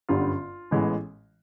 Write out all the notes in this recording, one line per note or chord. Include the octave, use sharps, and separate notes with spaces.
G1 F#2 D3 G3 B3 F4
A1 A2 E3 G#3 B3